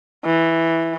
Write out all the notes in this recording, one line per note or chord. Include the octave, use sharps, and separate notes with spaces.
E3